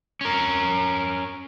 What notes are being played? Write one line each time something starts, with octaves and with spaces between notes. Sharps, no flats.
C#4 A#4